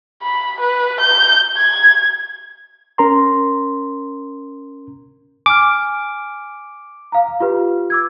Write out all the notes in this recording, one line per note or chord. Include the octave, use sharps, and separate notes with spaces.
B5
B4
G6
G#6
C#4 A#4 A#5 C6
G#5 D6 F6
F5 A#5
F4 G4 B4
D6 E6 G#6